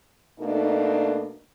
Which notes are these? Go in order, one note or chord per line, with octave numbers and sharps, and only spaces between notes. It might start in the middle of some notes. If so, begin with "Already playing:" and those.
B2 A3 A#3 D4 D#4